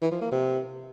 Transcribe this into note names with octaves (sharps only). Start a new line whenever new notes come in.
E3
F3
A#3
C3